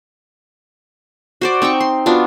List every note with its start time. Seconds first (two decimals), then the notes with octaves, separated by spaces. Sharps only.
1.41 F#4 C5 D5
1.62 C4 D#4 G5 C#6
1.80 C6
2.06 B3 D4 F4 F#4